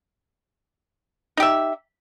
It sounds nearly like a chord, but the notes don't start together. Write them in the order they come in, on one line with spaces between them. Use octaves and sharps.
D#4 G4 E5